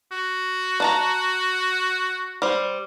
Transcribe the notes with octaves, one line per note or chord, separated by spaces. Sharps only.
F#4
D4 A5 A#5
G3 C5